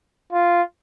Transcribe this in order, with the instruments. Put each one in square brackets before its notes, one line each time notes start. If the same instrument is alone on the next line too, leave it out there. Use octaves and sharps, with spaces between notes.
[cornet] F4